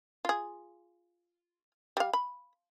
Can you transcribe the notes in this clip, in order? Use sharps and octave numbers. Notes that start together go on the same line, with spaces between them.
F4 G#4
G3 F5
B5